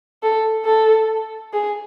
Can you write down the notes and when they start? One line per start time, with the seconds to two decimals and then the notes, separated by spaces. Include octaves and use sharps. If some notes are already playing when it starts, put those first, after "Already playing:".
0.23 A4
0.65 A4
1.53 G#4